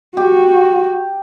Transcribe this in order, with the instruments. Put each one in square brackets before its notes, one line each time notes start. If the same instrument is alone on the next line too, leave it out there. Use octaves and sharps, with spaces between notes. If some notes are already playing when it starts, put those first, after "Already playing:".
[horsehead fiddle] F#4 [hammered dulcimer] G4